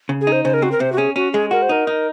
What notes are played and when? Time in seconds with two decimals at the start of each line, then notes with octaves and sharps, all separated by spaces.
0.09 C#3
0.21 G#4
0.27 D#4
0.32 C5
0.44 C#3 C5
0.54 A#4
0.62 C4 F#4
0.72 A#4
0.80 C3 C5
0.92 F#4
0.97 C#4 G#4
1.16 C#4 F#4
1.33 G#3 G#4
1.51 F#4 A#4
1.62 C5
1.69 D#4 A#4
1.87 D#4